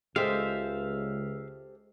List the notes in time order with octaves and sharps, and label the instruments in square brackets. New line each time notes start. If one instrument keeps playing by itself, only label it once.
[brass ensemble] C#2 [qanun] G#3 [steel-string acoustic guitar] G4 A4 C5 [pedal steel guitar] E5 F5